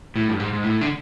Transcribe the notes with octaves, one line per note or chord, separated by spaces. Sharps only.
A2
G2
G#2
G#2
A2
D3